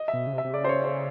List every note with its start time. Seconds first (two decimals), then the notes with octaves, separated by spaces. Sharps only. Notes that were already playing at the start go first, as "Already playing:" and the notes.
Already playing: D#5
0.08 E5
0.14 B2
0.27 C#3
0.33 C3
0.38 E5
0.44 C3
0.53 C#3 D5
0.64 C5
0.69 C#5
0.84 C5